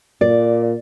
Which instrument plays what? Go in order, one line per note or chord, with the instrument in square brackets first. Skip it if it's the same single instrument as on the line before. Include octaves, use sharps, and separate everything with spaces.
[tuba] A#2 [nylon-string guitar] D5